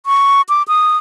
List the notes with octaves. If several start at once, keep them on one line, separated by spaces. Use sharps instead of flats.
C#6
D6
D#6